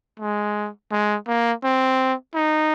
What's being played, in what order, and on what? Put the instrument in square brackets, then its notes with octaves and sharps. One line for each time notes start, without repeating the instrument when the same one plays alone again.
[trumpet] G#3
G#3
A#3
C4
D#4